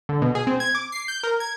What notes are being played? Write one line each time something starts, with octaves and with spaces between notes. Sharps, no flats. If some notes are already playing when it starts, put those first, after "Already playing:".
D3
B2
G#4
C4
G#6
D6
C7
G6
A#4
G#6